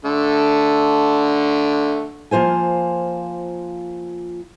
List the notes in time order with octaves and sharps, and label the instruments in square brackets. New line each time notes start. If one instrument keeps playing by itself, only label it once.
[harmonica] D3 A3
[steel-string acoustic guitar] F3 A#3 F4 C5 G#5